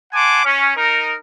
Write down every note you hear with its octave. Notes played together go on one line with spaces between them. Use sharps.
F#5 G#5 A5 C6 D6
C#4
D#4 A#4